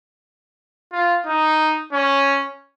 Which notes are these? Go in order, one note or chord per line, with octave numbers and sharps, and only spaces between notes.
F4
D#4
C#4